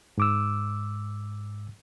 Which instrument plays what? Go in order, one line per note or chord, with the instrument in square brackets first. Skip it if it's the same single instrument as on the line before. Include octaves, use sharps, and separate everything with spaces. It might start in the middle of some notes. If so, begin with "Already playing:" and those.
[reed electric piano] G#2 D6 E6